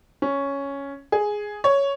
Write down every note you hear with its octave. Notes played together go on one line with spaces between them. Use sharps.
C#4
G#4
C#5